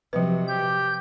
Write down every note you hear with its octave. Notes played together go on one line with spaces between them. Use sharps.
C3 F3 F#3 B4
G4 G6